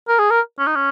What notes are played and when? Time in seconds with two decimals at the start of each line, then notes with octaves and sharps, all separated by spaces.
0.09 A#4
0.19 G#4
0.31 A#4
0.59 C#4
0.67 D#4
0.76 C#4